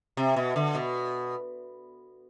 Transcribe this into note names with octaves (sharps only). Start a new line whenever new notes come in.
C3
B2
D3
B2